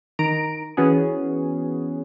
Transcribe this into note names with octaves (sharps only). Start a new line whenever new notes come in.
D#3 A#5 D7
E3 B3 C#4 F#4 G#4